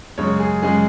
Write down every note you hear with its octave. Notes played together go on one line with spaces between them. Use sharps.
F#2 C#3 G#3 C#5
G#4
F#2 C#3 G#3 G#4